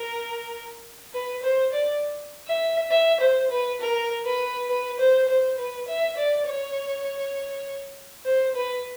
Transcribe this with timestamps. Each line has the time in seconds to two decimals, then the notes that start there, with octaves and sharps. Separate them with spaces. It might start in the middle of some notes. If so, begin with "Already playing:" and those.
Already playing: A#4
1.13 B4
1.43 C5
1.72 D5
2.47 E5
2.91 E5
3.20 C5
3.50 B4
3.80 A#4
4.25 B4
4.69 B4
4.99 C5
5.28 C5
5.57 B4
5.88 E5
6.17 D5
6.47 C#5
8.25 C5
8.55 B4